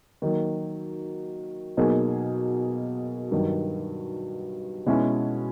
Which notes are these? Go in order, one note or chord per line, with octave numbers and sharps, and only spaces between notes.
D#3 F#3 A#3
B2 F#3 A#3 D#4 G#4
G2 D#3 F#3
B2 G#3 C#4 E4